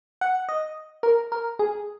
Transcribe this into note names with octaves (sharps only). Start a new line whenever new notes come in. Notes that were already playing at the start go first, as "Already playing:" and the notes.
F#5
D#5
A#4
A#4
G#4